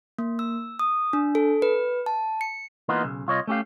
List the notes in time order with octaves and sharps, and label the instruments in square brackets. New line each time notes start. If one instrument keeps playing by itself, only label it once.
[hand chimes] A#3
E6
D#6
D4
A4
B4
A5
C#7
[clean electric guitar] E3 A#3 B3 D#4 F4
B1 C#3
C2 F4 C#5 D#5
A3 C#4 G4 F5